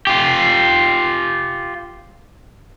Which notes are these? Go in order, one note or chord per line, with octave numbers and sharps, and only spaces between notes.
F4 G4